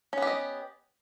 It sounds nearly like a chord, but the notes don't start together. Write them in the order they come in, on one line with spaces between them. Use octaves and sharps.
C#4 B3 G4 D#5